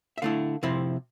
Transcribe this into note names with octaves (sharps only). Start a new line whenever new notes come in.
E5
D3 A3 E4 F5
C3 F3 C4 E4